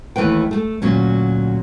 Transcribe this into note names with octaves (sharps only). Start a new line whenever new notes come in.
D#2 E3 A3 B4 G5
A3 G#4 A4
D2 A#2 F#3 C#4